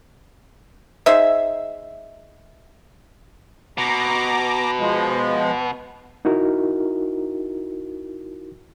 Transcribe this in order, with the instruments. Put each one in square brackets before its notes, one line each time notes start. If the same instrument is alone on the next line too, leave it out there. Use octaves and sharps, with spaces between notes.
[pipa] D#4 G#4 C5 E5
[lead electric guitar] B2 [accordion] A#5 D6
[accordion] F3 G#3
[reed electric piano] D#4 E4 F#4 A#4